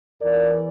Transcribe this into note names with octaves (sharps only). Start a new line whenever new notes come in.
E2 E3 A#4 D5